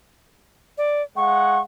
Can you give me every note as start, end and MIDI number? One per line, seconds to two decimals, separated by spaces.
0.78 1.02 74
1.17 1.60 56
1.17 1.60 77
1.17 1.60 78
1.17 1.61 85